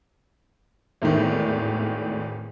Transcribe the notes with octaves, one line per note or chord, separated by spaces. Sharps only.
G#1 E2 A2 D#3